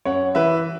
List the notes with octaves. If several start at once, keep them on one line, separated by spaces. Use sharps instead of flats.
F#2 C#5 F#5
E3 B4 E5